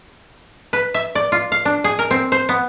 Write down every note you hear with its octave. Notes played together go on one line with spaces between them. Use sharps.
B4
E5
D5
F4
F5
D4
G#4
A#4
C4
C5
B3